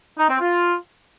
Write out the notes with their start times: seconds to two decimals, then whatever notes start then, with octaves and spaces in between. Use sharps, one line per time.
0.18 D#4
0.29 C4
0.40 F4